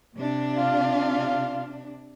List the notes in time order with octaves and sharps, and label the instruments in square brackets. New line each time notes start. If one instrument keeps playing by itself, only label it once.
[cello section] C3 D4
[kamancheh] F4 F5